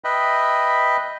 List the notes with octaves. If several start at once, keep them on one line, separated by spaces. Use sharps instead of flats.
B4 D#5 E5 G5 B5